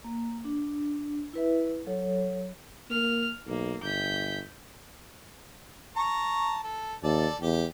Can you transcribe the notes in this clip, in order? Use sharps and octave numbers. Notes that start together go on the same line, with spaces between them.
A#3
D4
E4 B4 E5
F#3 A4 C#5
A#3 F6
B1 A#3
G1 G6 B6
A5 A#5 C#6
A4
D#2 A4 D5
E2 G4